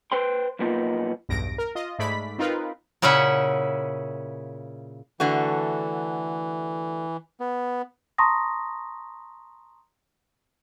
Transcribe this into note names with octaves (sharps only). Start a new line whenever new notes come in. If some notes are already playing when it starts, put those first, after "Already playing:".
B4 C5 G5 C6
B1 F2 A#3 B3 D#4 F4
B1 E2 G2 A#6 D7
A#4
F4 D#5
G#2 G#3 A3 D5 B5 B6
C4 D#4 F4 A#4 B4
A#2 C#3 C#4 E4 E5 F#5
D3 E3 A3 F#4
B3
A5 A#5 C6 C#6 D#6 A#6